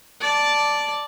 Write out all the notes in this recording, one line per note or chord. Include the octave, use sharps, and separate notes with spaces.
D5 A5